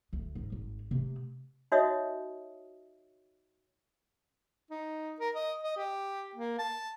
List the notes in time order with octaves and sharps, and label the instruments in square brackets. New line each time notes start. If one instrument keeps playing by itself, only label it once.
[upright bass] D2
G#2
G#1
C3 A3
[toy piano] D#4 F#4 C#5 D#5 E5 D#6
[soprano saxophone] D#4
A#4
D#5
D#5
G4
A#3
A5